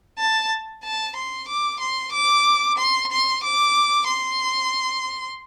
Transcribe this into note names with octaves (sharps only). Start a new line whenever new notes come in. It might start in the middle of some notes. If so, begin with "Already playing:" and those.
A5
A5
C6
D6
C6
D6
C6
C6
D6
C6